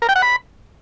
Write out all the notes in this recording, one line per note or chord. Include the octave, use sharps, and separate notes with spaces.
A#4
G5
F#5
B5